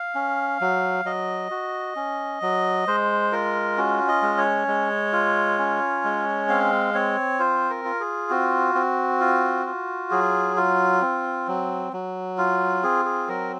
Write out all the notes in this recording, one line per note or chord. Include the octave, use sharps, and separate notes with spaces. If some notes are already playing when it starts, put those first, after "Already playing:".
Already playing: F5
C#4
F#3
F#3 D#5
F#4
C#4
F#3
G#3 C5
F4 A#4
C#4 F#4
D#5
G#3
C#5
G#3
F4
C#4
G#3
C4 F5
C4 C#5
F4 C5
A#4
F4
G#4
C4 F#4
C4
F4
F4
F#3 G#4
F4
C4
F#3
F#3
F4
C4 G#4
G#4
F#3 A#4